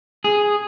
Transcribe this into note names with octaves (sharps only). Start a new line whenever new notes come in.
G#4